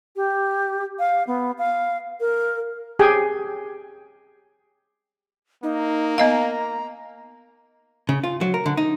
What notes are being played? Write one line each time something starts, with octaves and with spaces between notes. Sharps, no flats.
G4
F5
B3
F5
A#4
G4 G#4 G5 G#5
A#3 D#4
B3 D#5 F5 A#5
C#3
F4
F#3
A#4
D3
D#4